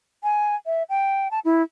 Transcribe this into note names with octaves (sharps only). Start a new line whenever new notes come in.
G#5
E5
G5
A5
E4